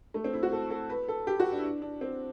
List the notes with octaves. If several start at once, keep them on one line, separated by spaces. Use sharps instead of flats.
A3
C4
E4
F#4
A4
A4
B4
A4
G4
F#4
D4
E4
D4
D4
C4